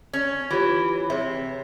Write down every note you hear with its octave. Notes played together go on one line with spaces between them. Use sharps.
C#4
E3 F4 G4 C#5
C3 G#4 C#5 E5